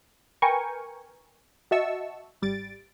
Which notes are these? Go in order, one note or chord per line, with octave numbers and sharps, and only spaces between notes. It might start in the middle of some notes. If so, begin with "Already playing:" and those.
A#4 B4 G5 G#5 C#6
F#4 D#5 E5 A5 C#6 E6
G#1 G3 A6 D7